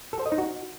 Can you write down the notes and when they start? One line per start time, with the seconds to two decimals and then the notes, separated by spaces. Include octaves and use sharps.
0.13 A4
0.19 C5
0.26 D#5
0.32 D#4
0.38 F#4